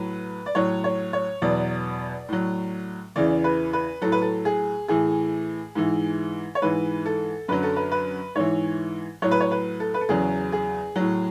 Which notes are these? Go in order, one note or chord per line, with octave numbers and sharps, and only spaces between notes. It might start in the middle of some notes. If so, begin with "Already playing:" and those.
Already playing: A2 F#3 B4
D5
A2 F#3 C#5
C#5
C#5
E2 B2 F#3 D5
A2 F#3
E2 C#3 E3 D5
B4
B4
A2 F#3 A4
B4
A4
G#4
A2 E3 G#4
G#2 E3
C#5
G#2 E3 B4
A4
F#2 D3 F#3 B4
A4
B4
B4
G#2 E3 C#5
A2 F#3 C#5
B4
C#5
B4
A4
B4
A4
E2 C#3 F#3 G#4
G#4
A2 F#3